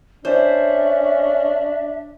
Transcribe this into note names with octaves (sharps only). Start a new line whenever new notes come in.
C#4 D4 C5 E5